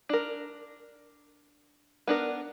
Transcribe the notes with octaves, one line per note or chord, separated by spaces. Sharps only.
D4 A#4
B3 D4 A#4